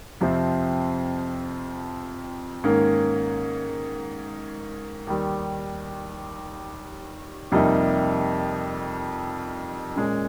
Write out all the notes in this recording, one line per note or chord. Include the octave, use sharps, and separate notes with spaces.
F2 C3 F3 C4
G#2 D#3 A#3 C#4
D#2 D#3 G3
F2 C3 G3 A#3 D#4
A#2 G#3 C#4